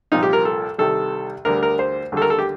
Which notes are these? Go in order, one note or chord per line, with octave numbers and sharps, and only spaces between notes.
C2 A#2 F3 D#4
G4
A#4
A4
C2 C3 D#3 G3 A4
D2 D3 G3 A#4
A#4
C5
D#2 D3 G3 A4
A#4
A4
G4